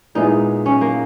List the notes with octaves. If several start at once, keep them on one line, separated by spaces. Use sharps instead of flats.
A#2 G#3 B3 D#4 E4 G#4
C#4
A#3